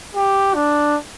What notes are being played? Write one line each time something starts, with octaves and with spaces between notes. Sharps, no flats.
G4
D4